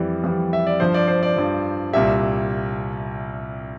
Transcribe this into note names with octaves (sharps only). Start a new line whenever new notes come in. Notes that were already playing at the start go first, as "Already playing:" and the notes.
Already playing: F2 E3 G3 D5
F2 E3 G3
E5
D5
G2 F3 C5
D5
C5
D5
G2 F3
C2 A#2 G3 E5